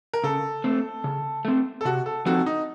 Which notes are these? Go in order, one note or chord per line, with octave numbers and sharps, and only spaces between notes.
A#4
C#3 A4
A3 C4
C#3
A3 C4
A4
C3 F#4
A4
F3 C4 D#4 F#4 A4
D#4